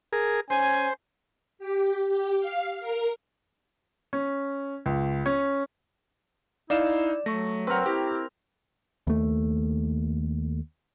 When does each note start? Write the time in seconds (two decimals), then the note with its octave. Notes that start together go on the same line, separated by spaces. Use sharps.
0.13 G#4 A#4
0.50 C#4 C5 G#5
1.59 G4
2.09 G4
2.40 F5
2.80 A#4
4.13 C#4
4.86 C#2
5.26 C#4
6.70 D#4 E4 D5 F5 E7
7.26 F#3 A3 C#6 A#6
7.67 C4 A#4 B4 F#5
7.86 E4 G4
9.07 D#2 A3